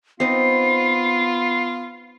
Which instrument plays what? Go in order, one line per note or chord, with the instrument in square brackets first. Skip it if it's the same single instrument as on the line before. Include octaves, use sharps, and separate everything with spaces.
[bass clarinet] B3 [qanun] C4 D#4 [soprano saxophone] F4 [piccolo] C7